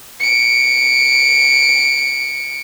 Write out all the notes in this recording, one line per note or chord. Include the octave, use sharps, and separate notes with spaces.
C#7 D7